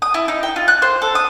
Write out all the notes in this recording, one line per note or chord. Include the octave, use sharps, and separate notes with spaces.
D#6
E4
D#4
G5
F4
F#6
C5
A4
D#6